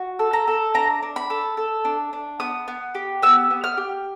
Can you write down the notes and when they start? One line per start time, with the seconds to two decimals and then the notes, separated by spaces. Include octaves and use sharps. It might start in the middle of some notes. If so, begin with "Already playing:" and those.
Already playing: F#4
0.19 A4
0.33 A#5
0.48 A4
0.74 D4 A#5
1.03 D4
1.16 B5
1.30 A4
1.57 A4
1.85 D4
2.13 D4
2.40 B3 D#6
2.68 B3
2.95 G4
3.22 B3 E6
3.51 B3
3.64 F6
3.77 G4